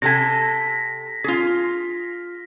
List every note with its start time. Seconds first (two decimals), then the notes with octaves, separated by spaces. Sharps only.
0.02 C3 A4 G#5 A#6 B6
1.24 F4 G#4